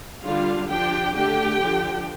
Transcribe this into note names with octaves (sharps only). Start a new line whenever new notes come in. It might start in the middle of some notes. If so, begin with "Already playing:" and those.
D3 G3 D4 F4 F5
F3 D4 G4 G5
D3 A3 D4 G4 G5
D3 F3 D4